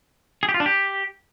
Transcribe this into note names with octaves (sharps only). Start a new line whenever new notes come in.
G#4
G4
F4
D4
G4